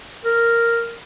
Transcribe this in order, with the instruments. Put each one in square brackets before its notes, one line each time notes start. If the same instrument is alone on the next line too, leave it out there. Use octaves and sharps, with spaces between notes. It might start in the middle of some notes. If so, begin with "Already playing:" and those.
[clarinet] A#4